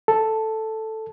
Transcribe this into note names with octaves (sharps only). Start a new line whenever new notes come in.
A4